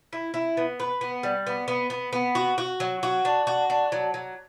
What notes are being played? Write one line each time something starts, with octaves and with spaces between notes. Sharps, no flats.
E4
E4
B3
B4
B3
G3
B3
B3
B3
B3
F#4
F#4
F#3
F#4
D4
F#4
D4
F#3
F#3